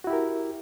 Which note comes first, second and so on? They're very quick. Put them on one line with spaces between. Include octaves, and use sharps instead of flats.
F#4 E4 G4 A#4